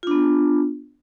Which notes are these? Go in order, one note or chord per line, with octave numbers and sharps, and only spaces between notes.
B3 D4 F4